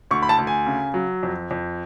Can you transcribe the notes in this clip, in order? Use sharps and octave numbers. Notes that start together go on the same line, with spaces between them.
D2 C#6
B5
A5
D2
G#5
C#3
F#3
F2
F2